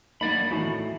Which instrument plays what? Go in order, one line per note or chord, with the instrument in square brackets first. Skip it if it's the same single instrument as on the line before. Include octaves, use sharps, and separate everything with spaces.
[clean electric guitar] F#3 D5 B5 [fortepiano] A#3 D4 D#4
[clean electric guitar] A2 A3 [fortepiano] D#3 E3 F#3